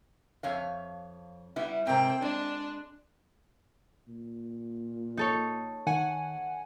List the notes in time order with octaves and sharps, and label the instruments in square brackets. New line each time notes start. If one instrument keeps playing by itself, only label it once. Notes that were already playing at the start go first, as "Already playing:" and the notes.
[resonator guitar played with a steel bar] F2 C#5 F5
G3 B3 E4
[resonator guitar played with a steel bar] G#2 C3 [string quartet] C4 A#4 G5
[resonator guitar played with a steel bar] G#3 [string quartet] D4
[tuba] A#2
[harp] D#4 A4 C#5
[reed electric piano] D#3 [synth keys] F#5 G#5